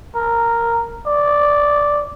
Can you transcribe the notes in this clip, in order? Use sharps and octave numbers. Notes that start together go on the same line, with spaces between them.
A#4
D5